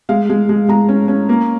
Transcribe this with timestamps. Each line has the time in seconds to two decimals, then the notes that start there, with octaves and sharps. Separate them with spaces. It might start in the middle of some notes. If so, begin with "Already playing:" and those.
0.09 G#3 F5
0.29 G#3
0.49 G#3
0.68 G#3 A#5
0.89 C#4
1.08 C#4
1.29 A#3